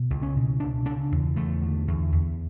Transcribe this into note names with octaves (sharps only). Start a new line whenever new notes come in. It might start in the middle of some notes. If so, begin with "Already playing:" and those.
Already playing: B2
C#2
C#4
B2
C#3 D4
C#3 D4
E2
E2 A3
D3
E2
E2